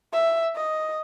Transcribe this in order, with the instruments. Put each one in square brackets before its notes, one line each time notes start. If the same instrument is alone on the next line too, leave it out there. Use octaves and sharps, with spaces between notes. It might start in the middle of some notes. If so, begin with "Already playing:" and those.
[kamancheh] E5
D#5